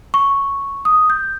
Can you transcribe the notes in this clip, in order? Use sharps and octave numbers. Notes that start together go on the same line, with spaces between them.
C#6
D#6
G6